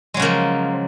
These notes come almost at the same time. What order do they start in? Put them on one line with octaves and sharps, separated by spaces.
G#3 F#3 C#3 A#3 F3